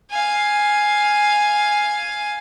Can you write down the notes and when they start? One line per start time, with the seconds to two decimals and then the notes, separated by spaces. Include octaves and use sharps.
0.11 F5 G#5